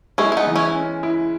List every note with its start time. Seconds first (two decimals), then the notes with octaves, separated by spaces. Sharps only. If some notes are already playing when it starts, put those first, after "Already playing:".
0.18 G#3 C#4 E4
0.32 E4
0.37 B3 D#4
0.47 E3
0.55 C#4 E4
0.76 C#4
1.03 E4